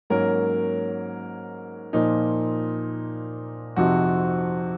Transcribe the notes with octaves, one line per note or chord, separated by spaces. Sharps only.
G#2 F#3 A#3 C#4 A#4
A#2 F3 A#3 D#4
F2 C3 F3 C4 D#4 F#4